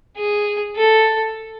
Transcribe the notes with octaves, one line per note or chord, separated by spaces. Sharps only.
G#4
A4